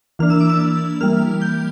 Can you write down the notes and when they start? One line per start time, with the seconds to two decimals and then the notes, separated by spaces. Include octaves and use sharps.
0.19 E3 A#3 D4 F6
0.30 E6
0.40 D6
0.50 E6
0.60 E6
1.01 E3 G3 A#3 F6
1.42 G6